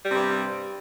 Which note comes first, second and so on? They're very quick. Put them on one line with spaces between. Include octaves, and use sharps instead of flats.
G3 C3 G2